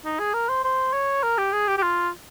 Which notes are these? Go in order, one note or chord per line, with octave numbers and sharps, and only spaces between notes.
D#4
G#4
A#4
C5
C5
C#5
A#4
G4
G#4
G4
G4
F4